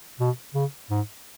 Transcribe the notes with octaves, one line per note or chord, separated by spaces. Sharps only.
B2
C#3
G#2